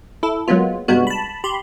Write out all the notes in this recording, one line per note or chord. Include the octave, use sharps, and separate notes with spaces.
E4 A4
F#3 G#3 A#3 B3 F4
G2 C3 G3 G#3 B3 F#4
A5 B5
G4 B5 C6